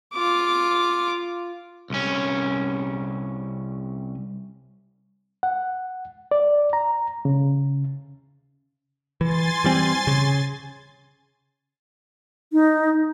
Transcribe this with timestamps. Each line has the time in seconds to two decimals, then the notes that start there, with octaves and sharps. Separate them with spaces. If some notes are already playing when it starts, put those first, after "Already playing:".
0.14 F4 D6
1.90 C2 C#4
5.43 F#5
6.31 D5
6.73 A#5
7.25 C#3
9.21 E3 G#5 C6 A6
9.64 E3 G3 C4
10.07 C#3
12.53 D#4